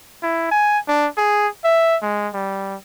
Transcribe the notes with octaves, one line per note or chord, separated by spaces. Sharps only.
E4
G#5
D4
G#4
E5
G#3
G3